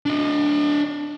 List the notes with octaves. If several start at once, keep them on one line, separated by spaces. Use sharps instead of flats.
D4 D#5